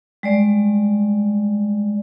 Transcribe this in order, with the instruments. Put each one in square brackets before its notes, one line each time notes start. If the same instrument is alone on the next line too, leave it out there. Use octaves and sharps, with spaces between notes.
[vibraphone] G3 G#3 D5